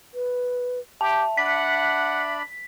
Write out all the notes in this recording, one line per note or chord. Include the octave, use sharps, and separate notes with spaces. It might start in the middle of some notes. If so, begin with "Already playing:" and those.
B4
G4 E5 A5
D4 D5 F#5 B5 B6